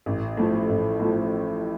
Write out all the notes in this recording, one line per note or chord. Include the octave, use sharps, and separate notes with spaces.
A1
A2 F3 A3
A1
A2 F3 A3